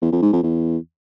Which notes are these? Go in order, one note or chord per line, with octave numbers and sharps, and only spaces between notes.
E2
F2
G#2
F2
E2